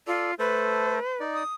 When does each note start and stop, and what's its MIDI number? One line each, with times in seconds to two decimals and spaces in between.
0.07 0.34 65
0.07 0.31 69
0.07 0.31 74
0.39 0.99 57
0.39 0.99 69
0.39 1.19 71
0.39 0.99 72
1.20 1.43 63
1.20 1.43 74
1.34 1.55 87